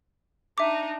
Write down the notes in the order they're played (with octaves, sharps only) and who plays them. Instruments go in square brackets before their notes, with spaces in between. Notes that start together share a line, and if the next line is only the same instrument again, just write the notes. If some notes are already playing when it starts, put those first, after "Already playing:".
[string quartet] D4 D#4 [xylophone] E5 D6